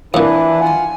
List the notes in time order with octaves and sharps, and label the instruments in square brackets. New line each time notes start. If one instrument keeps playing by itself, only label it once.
[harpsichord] F2 A#2 [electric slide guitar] E3 [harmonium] D4 E4 B4
[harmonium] F4 F#5 [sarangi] G#5